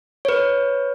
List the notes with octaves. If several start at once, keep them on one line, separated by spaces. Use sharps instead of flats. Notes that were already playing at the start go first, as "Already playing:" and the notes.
B4 C#5